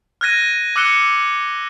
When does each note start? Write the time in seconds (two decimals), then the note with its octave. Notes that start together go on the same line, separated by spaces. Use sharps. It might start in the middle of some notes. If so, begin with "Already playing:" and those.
0.21 F6 F#6 G#6 A#6 D#7
0.76 D6 E6 F#6 C#7 E7 G7